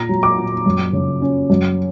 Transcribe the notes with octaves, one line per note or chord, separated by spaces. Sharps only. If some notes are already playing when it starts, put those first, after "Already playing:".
Already playing: A#2 A#5
F#3
D6
A#2
F#2
C#3
C#4
F#2